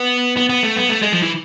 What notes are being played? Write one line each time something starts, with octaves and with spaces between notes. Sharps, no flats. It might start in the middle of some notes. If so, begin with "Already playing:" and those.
Already playing: B3
B3
B3
A3
B3
A3
G#3
F3
E3